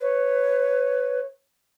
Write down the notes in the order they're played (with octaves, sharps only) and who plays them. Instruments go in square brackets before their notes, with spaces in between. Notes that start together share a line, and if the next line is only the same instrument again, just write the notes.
[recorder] B4 [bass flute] C#5